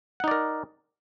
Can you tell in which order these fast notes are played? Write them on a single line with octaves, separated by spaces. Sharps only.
F#5 D#4 D5 A#4